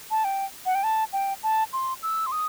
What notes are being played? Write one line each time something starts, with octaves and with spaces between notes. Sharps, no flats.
A5
G5
F#5
G5
A5
G5
A5
C6
E6
C6
D#6